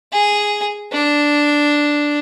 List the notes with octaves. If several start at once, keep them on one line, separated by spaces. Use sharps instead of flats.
G#4
D4